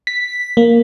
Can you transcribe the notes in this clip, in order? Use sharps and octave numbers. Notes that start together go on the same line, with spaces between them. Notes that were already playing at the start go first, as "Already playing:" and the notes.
B6
A#3